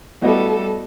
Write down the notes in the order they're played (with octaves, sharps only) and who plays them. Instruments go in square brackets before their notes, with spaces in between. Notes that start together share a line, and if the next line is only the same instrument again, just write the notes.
[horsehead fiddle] G3 A4 [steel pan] A3 B3 E4 [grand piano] F#4 D#5